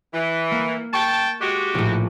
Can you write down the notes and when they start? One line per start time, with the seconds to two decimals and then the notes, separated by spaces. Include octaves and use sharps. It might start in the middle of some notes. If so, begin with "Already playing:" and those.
0.13 E3
0.51 A#3
0.93 G5 A5 C#6
1.41 G#3 F#4 G4
1.74 A#1 A2